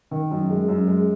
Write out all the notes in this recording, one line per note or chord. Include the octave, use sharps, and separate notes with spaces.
D#3
F#2
G#3
F#2
G#3